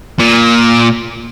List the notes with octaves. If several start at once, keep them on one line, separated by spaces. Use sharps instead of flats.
A#2